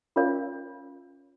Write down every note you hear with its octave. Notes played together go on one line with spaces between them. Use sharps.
C#4 F4 A#4 C#5 F5